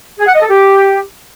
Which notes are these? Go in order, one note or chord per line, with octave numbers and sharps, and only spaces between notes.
G#4
F#5
D#5
A4
G4